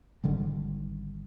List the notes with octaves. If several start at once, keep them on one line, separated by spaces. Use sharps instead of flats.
G#1 D3 D#3 G3